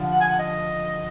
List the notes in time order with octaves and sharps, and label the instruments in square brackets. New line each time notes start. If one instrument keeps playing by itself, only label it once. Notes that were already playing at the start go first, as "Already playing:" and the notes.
Already playing: [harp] D3 F3
[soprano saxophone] F#5
G#5
F#5
D#5